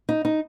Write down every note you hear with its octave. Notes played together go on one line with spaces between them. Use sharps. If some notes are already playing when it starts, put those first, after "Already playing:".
D#4
D#4